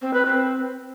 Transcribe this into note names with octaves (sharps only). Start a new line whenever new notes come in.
C4
B4
C4